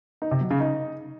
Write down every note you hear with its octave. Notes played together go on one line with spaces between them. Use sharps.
D#4
C3
F#3
C#3
D#4